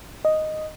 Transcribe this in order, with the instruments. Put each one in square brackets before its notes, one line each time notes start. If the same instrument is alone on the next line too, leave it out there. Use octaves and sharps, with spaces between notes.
[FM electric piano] D#5